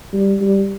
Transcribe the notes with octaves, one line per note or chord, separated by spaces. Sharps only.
G3
G3